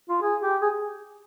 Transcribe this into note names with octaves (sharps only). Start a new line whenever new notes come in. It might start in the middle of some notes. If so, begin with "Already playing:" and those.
F4
G#4
G4
G#4